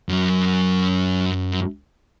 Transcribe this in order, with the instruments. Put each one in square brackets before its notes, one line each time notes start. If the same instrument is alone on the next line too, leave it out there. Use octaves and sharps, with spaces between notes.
[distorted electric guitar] F#2 F#3